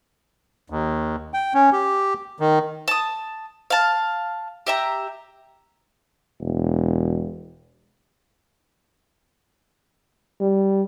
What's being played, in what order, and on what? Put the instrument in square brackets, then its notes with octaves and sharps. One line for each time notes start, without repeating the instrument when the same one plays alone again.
[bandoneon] D#2
G5
C#4
G4
D#3
[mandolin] A5 D#6
F5 A5
G4 E5 A#5
[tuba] E1
[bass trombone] G3